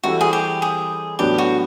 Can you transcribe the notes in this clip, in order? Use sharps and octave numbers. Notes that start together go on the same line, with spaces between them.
E3 G3 C4 E4 F#4 A4
G#4
G4
G#4
A2 F#3 B3 D4 G4
F#4